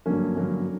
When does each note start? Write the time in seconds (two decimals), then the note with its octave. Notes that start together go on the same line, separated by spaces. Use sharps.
0.06 G2 D3 F#3 A#3 C#4
0.35 G2 D3 F#3 A#3 C#4